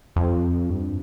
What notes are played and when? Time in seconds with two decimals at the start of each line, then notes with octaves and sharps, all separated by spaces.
0.16 F2
0.70 G2